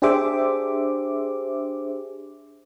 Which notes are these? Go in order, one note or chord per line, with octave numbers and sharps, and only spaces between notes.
D4 G4 G#4 C5 E5 D6